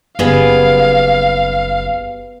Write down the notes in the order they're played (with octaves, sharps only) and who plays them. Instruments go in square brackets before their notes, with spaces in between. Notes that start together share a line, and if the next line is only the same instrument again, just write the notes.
[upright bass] F#1 [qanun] G3 B3 G#4 [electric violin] F5